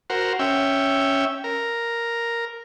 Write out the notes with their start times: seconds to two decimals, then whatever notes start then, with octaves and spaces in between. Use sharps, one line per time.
0.10 F#4 A#4 C5
0.39 C#4 E5 G5
1.44 A#4